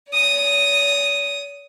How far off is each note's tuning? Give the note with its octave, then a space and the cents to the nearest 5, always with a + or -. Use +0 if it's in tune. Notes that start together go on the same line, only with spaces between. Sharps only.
C#5 +45 D#6 +0